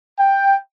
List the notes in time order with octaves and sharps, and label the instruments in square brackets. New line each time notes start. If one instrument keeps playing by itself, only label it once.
[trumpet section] G5